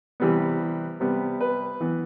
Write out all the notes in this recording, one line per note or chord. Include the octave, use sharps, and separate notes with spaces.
C3 E3 G3 B3
C3 G3 B3
B4
E3 B3